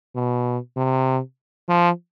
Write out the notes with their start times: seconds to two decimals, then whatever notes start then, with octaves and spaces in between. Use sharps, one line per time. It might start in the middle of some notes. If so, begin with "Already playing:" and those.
0.15 B2
0.77 C3
1.69 F3